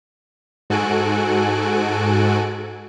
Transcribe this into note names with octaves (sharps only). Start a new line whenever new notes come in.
G#2 F#4 A4 G#5 F#6 D7